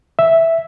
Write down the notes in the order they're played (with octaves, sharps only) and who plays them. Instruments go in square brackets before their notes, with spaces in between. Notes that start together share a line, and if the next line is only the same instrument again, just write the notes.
[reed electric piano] E5